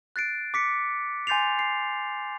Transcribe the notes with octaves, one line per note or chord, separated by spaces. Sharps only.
F#6 A6 C7 D7
D6 B6 C#7
G#5 C6 G6 A6 C7 F7
C7